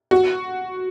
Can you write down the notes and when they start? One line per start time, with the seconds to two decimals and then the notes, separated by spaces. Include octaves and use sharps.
0.11 F#4